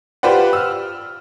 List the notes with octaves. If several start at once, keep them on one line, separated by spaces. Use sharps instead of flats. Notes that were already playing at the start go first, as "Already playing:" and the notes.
F4 G4 B4 C5 D5 F#5
E6 F6